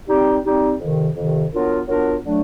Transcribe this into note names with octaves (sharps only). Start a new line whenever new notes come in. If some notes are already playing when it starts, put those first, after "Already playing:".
G3 C4 D#4 G4
G3 C4 D#4 G4
F2 C3 D#3
F2 C3 D#3
F#3 B3 D4 F4 A#4
F#3 B3 D4 F4 A#4
D3 F#3 A3 D4